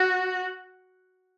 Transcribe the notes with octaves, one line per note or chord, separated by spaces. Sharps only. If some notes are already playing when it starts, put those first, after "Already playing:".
Already playing: F#4